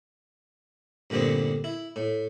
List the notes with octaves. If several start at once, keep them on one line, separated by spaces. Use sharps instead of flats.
G2 A#2 D3 B3 C4
E4
A2